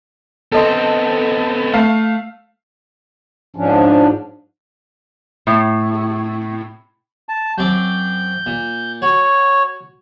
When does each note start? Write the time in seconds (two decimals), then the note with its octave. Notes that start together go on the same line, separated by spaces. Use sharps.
0.52 B3 C4 A4 D#5 C6
1.74 A3 F5
3.56 G#2 F3 C#4 D4
5.47 A2
7.29 A5
7.58 F#2 C4 D6 G6
8.46 A#2
9.02 F#4 C#5